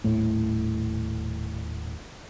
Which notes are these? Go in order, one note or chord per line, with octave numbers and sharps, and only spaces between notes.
D#1 A2